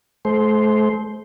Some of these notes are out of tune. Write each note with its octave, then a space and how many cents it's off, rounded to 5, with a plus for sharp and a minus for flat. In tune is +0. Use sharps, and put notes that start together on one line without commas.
A3 -40 C5 +0